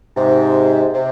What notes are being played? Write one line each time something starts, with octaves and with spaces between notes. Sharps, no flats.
G#2 C3
C3